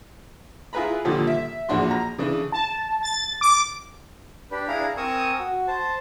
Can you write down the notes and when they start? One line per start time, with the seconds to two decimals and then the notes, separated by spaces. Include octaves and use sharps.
0.73 E4 F4 G#4 B4 A#5 B5
1.05 A#2 D3 D#3 F3 G3 A4
1.27 E5
1.69 A#1 E2 F3 D4 F#4 C6
1.91 A#5
2.18 C#3 E3 D4
2.52 A5
3.03 A6
3.41 D6
4.51 D4 G4 B4
4.68 D4 E4 G#4 F5 A#5
4.97 C4 A#4 G#5 C#6 D#6 E6
5.39 F#4
5.68 C5 A5